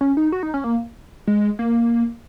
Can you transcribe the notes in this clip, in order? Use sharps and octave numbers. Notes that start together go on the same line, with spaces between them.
C#4
D#4
F#4
D#4
C#4
A#3
G#3
A#3